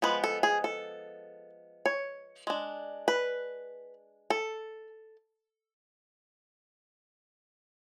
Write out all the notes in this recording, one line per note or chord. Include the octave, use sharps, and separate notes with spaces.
F3 G#3 B3 B4
A4
G#4
A4
C#5
G#3 D4
B4
A4